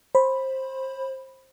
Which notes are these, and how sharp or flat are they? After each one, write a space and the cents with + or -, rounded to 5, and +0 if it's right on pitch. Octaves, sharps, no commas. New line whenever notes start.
C5 +20 B5 +0